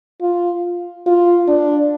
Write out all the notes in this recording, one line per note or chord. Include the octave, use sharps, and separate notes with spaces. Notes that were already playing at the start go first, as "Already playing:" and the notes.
F4
F4
D4